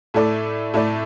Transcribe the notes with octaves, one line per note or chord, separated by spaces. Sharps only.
A2 A3 E4 A4 D5
A2 A3 E4 A4 D5